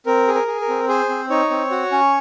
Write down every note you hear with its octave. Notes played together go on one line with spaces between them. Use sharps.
C4 A#4
G#4
A#4
G#4
A#4
C4
G#4 C5
C4
D#4 C#5
C4
F#4
C#4